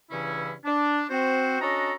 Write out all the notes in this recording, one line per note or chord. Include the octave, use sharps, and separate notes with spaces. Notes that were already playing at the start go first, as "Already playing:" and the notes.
G2 C#3 E3 C#4 E4
D4
C4 F#4 C5
C#4 D4 F#4 A4 D#5 A#5